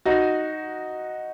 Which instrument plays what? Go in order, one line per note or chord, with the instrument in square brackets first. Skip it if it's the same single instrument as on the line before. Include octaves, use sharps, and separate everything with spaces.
[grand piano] D#4 F#4